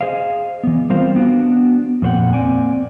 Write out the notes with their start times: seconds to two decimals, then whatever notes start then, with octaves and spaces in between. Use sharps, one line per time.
0.01 G#4 C5 D#5 F5
0.63 E3 B3
0.90 G3 C4 F4 A#4 C5 F5
1.15 B3 D4 F#4
2.02 F2 A#2 C5 F#5 G5
2.33 A#3 C4 D5 G#5